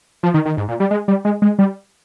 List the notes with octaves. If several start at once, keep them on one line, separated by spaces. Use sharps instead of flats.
F3
D#3
D#3
G#2
A#2
G3
G#3
G3
G#3
G#3
G3